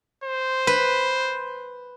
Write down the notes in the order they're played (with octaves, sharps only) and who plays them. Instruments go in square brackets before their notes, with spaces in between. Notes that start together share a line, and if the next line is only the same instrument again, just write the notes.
[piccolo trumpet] C5
[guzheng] B4